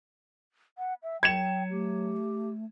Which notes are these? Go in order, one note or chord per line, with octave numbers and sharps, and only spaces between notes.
F#5
E5
F#3 G5 G#6 C#7 E7
A3 G4